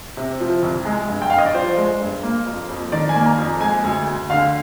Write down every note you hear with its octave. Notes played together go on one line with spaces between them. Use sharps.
C3
F3
C2
G#3
G2
G5
G2 F5
D#5
D5
F3 C5
G#3
G2
A#3
F2
F2
D#3 D5
G#5
A#3
A#5
F2
G#3 G#5
D2
D2
D3 F5